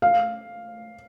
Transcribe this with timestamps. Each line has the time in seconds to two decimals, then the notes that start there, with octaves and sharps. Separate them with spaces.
0.02 F5